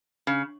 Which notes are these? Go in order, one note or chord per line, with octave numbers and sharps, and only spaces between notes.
C#3